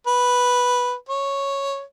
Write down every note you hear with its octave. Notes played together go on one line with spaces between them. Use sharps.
B4
C#5